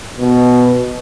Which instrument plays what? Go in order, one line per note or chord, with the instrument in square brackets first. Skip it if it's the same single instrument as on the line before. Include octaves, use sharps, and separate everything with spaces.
[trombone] B2